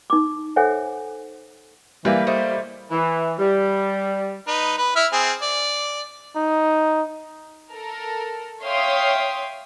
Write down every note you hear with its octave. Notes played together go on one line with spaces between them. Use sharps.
D#4 D6
A4 C5 C#5 E5 F#5 G#5
E3 G3 A#3 B4 E5
A3 C5 D#5
E3
G3
D#4 B4
B4
E4 E5 F6
C4 G#4
D5
D#4
A4 A#4
C#5 E5 F5 G5 C6 D#6